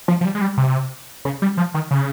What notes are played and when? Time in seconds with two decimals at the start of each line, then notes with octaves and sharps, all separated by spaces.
0.08 F3
0.21 F3
0.25 G3
0.35 G#3
0.41 G3
0.57 C3
1.25 C#3
1.42 G3
1.57 F3
1.74 D#3
1.91 C#3